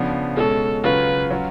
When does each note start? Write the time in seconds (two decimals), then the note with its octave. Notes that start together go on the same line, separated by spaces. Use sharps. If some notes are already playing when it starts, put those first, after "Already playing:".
Already playing: C#3 F3 B3 D4
0.37 B2 G#3 C#4 A4
0.84 C#3 F#3 C#4 F4 B4
1.31 F#3 C#4 F4